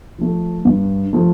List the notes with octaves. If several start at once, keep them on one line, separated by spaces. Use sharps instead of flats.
F3 A3
G2
F3 A3